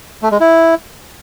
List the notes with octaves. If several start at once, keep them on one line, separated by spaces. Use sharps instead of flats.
A3
G#3
E4